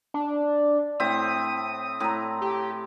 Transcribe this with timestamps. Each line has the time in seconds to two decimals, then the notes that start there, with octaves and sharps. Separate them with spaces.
0.14 D4
1.00 A2 C4 E5 D#6
2.00 A2 A#5
2.42 G4